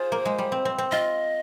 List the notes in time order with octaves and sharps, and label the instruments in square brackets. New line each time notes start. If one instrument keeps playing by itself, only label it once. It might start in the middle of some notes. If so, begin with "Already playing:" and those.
Already playing: [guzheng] F4 G#4 [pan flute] C5
[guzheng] A#3
G#3
G3
C4
C4
C4
[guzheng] F4 [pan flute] D#5